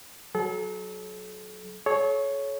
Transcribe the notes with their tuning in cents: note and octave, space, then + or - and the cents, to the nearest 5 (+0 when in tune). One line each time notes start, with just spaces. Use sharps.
F#3 +5 A4 -40
A4 -45 C#5 +0